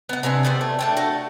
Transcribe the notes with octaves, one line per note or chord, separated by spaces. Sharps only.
B3 F#5
C3 B3 D4 G#5
B3 G4 C5 D5
A3
A3 D4 G5
A3 F#4 A5